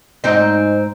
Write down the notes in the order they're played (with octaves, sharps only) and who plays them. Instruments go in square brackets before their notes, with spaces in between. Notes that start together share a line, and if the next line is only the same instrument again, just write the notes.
[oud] G#2 C4 D#4